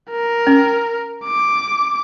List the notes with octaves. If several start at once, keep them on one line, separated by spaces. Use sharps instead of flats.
A#4
C#4
D6